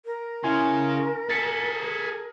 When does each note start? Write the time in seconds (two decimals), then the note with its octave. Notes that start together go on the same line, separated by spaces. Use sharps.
0.05 A#4
0.44 C#3 E4 G#5 C6
1.30 G#4 A4 A6 B6 C#7